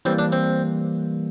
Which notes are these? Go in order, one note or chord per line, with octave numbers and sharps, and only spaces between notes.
E3 G3 A#3 C4
D4
C4